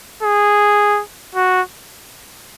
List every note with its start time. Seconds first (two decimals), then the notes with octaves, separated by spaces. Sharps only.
0.23 G#4
1.35 F#4